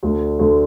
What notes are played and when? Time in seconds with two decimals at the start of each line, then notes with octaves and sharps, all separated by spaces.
0.03 D2 D3 A3
0.39 D2 D3 A3